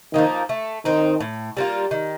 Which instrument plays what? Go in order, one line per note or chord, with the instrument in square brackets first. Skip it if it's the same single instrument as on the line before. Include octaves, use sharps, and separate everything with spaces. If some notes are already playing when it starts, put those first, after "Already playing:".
[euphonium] D#3 [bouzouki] F3 A#3 D#4
[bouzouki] A3
[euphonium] D#3 [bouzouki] C4 D#4
[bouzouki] A2
G3 A#3 F4
D#3